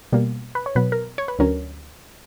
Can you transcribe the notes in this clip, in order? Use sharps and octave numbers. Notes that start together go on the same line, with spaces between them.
B2 G3 A#3
B4
C#5
B2 F#3 B3 B4
A#4
C#5
B4
D2 D3 F#3 C#4 A#4